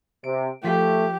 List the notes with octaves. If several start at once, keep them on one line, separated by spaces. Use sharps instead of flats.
C3 D7
F3 A3 F4 G4 B6